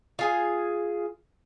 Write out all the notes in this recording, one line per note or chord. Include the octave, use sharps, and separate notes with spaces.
F4 G#4 G#5